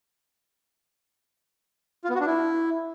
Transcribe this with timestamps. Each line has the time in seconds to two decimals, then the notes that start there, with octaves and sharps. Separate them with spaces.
2.04 F4
2.10 B3
2.15 F#4
2.21 D4
2.26 E4